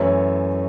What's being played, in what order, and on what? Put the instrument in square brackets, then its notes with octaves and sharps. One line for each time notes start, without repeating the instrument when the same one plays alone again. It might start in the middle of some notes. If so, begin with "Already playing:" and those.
Already playing: [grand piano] F#2 E3 A3 C#4 C#5 E5